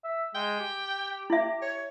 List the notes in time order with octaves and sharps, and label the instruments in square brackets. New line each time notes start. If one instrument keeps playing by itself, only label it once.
[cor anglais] E5
[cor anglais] G#3 [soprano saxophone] G5
[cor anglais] G4
[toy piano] E4 E5
[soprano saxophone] C#5